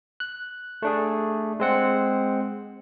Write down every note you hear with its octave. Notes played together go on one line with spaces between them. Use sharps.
F#6
A3 D4 G#4
G#3 C4 F#5